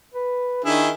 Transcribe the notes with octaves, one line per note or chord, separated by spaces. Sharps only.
B4
D#3 D4 E4 G#4